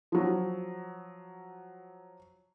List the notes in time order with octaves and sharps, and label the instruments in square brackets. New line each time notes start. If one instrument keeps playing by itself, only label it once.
[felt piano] F3 F#3